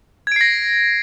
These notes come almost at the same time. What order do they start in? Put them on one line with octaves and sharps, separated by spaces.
G#6 D7 C7 A#6